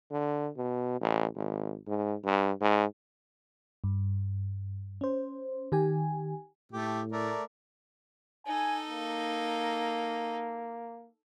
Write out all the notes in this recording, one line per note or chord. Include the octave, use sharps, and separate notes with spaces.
D3
B2
A1
G#1
G#2
G2
G#2
G2
C#4 C5
D#3 G4 G#5
A2 A3 G4
A3 A#4 D5
D#4 A4 G#5
A#3